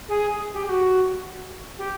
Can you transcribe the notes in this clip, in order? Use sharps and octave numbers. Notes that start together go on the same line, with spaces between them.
G#4
G4
G4
F#4
G4